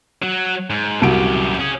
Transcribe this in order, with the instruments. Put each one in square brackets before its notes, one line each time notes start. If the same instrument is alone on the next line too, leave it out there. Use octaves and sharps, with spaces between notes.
[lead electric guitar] F#3
G#2
[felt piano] C2 F#4 D7 [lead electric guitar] F#2 G4
[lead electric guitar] C#4 G#4